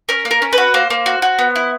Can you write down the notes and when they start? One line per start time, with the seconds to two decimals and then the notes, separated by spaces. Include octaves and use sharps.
0.09 C#4 A#4
0.25 A#3
0.31 A#4
0.42 C#4
0.53 B4
0.58 F#4
0.74 A#3 C5
0.90 A#3
1.06 F#4
1.22 F#4
1.39 B3
1.56 E4